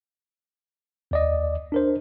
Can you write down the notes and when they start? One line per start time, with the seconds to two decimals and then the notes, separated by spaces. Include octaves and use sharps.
1.11 D#2 D5 D#5
1.72 D4 A#4 C5